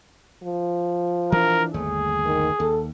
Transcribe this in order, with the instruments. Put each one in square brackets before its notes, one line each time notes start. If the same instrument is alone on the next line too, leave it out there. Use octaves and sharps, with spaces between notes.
[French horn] F3
[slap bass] E3 D4 [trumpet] A#4
[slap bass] G1 D#2 A3 [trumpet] G#4
[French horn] D#3
[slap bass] D#2 [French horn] A4